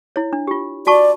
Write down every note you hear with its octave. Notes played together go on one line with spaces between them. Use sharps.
E4 C#5
D4
F4 G4
F#4 D5 A5 C#6